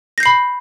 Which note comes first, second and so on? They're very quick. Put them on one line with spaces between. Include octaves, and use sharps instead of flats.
A#6 G6 C7 B5